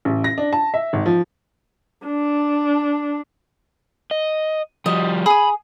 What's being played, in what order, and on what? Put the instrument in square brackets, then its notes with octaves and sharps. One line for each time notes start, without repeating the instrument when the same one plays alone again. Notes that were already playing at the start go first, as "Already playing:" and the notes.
[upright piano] A1
A#6
D4
A5
E5
G#1
F3
[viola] D4
[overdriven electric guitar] D#5
[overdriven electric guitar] F3 G3 [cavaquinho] D#5
[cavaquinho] G#4 D#6 [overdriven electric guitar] B5